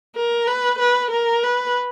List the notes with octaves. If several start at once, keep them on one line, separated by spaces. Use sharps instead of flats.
A#4
B4
B4
A#4
B4